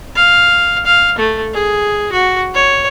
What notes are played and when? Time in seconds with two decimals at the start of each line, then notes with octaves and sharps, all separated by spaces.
0.16 F5
0.86 F5
1.18 A3
1.53 G#4
2.12 F#4
2.54 C#5